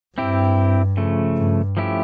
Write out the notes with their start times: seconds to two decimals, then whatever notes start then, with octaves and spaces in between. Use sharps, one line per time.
0.17 G2 C4 E4 G4
0.97 C#3 F3 A3
1.37 G2
1.77 F3 A3 C#4 E4 G4